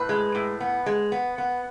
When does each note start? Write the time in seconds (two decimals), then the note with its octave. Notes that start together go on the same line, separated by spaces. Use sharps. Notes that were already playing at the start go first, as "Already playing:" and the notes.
Already playing: A2 B4
0.09 G#3
0.35 A2
0.60 B3
0.86 G#3
1.12 B3
1.38 B3